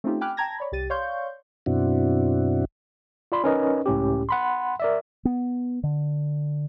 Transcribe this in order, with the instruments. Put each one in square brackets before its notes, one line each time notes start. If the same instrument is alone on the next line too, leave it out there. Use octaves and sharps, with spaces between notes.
[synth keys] A3 C4 C#4 D#4 F4 G4
G5 G#5 B5 D6 F6 F#6
G5 A5 A#5 G#6 A#6
C#5 D5 B5
C2 G4 A6 D#7
C#5 D5 F5 C6 C#6 G6
[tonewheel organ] F#2 B2 C4 D4 E4 F#4
[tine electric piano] F4 D5 B5 C6
C#4 D#4 A#4 B4 D#5
C#2 A2 C#4 G4
F#5 B5 C6
A#4 D5 E5
[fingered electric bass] B3
D3